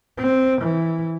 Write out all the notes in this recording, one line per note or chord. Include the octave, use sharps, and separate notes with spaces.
C4
E3